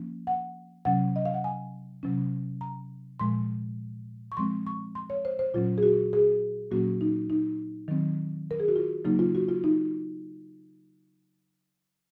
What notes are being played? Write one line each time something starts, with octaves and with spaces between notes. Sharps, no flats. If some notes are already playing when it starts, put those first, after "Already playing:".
Already playing: F3 A#3 C#4
F#5
C3 F#3 C#4 F#5
D#5
F5
F#5
G#5
C3 F#3 C#4
A#5
A#2 F3 G#3 C6
C#6
F3 G#3 C4 C6
C#6
C6
C#5
C5
C5
A#2 F#3 C#4 F4
G#4
F#4
G#4
A#2 F#3 A#3 C#4 F#4
D#4
D#4
D#3 F#3 C4
A#4
G#4
F#4
F4
C#3 F#3 A#3 D#4
F4
F#4
F4
D#4